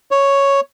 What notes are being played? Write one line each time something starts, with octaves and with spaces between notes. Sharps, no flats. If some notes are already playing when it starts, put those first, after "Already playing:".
C#5